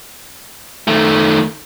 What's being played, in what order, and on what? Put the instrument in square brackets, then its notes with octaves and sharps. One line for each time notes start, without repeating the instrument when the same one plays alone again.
[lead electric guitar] D#3 A3